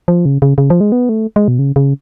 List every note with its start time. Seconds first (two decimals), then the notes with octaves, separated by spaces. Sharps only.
0.08 F3
0.26 C#3
0.42 C#3
0.58 C#3
0.70 F3
0.81 G#3
0.92 B3
1.09 A3
1.36 G#3
1.48 B2
1.59 C#3
1.76 C#3